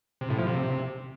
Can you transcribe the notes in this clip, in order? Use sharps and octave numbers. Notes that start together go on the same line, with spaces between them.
C3
A2
F3
C3